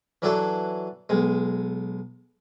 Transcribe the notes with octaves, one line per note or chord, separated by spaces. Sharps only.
E3 F#3 D4 F#4 A4
B1 G#3